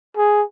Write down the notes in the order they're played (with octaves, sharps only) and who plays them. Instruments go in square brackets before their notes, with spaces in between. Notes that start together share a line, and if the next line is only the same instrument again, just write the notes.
[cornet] G#4